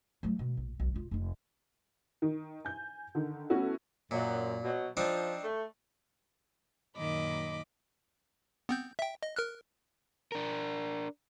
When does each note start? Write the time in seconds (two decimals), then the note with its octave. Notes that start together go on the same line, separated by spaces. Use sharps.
0.23 F#3 A3
0.39 B2
0.57 A#1
0.80 B1
0.94 E1 F4
1.11 F1 D#4
2.22 D#3
2.65 G#5 G6
3.15 D3 D#3
3.50 A3 B3 C#4 E4 F#4 A4
4.11 F#2 A#2
4.63 B2 F#3
4.97 F3 C4 D4 D#4
5.43 A3
6.97 F#2 A#2 D#3 D#5 B5 D6
8.69 B3 C4 G6
8.99 E5 G5
9.23 D#5
9.36 A#4 F6 F#6
10.32 D4 A#4